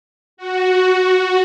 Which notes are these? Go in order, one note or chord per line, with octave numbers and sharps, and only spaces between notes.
F#4